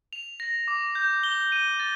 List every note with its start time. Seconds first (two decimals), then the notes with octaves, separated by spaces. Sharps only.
0.13 F7
0.40 A#6
0.68 D6
0.95 G6
1.24 G7
1.52 D#7
1.80 A6